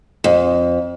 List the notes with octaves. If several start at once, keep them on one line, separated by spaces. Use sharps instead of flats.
F2